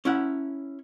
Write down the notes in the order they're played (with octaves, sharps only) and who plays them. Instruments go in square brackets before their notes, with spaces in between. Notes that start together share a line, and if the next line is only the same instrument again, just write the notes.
[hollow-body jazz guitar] C#4 E4 F#5